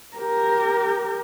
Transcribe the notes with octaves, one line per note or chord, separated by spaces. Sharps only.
G4 A#4